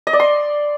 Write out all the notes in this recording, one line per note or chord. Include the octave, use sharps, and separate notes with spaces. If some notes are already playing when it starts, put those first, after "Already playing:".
D#5
D5
C6